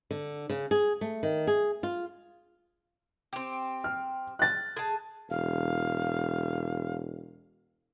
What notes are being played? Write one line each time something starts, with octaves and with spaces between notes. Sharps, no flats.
D3
C#3
G#4
A3
D#3
G#4
F4
C4 G4
F6
F#6 A6
G#4 A5
E1 F5